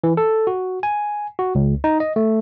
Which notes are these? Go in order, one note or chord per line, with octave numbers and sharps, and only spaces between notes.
E3
A4
F#4
G#5
F#4
C#2
D#4
D#5
A3